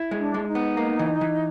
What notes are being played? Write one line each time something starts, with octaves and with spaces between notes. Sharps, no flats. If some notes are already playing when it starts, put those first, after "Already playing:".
Already playing: E4
G#3
D4
G#3
D4
D#4
B3
A#3
E3
E3